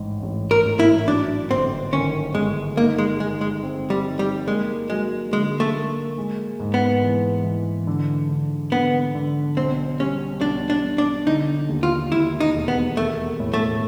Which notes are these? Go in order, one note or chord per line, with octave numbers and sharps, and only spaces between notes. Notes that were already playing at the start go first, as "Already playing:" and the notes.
Already playing: A1 G#2
A1
A#4
A1
E4
F#3 D4
G1 C4
D#3 C#4
G1 G#3
A#3 D#4
G#3
G#3 D#4
G#3
C4
G3
D#4
G3
G#3 A#3
F#3 G#3
D3 G#3
A3
A#3
G#3
G#2
B3
E3
E3
D3
D3
D3 B3
D3
B1 C4
G3 C#4
B1 D4
D4
B1
D4
D3 D#4
D#2
F4
D#2 E4
D#4
E1
B3
A3 A#3
A2
A3